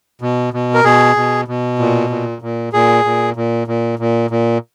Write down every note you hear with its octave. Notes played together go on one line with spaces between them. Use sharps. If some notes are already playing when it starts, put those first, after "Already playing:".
B2
B2
A#4
B2 G#4
B2
B2
A#2
A#2
A#2
A#2 G#4
A#2
A#2
A#2
A#2
A#2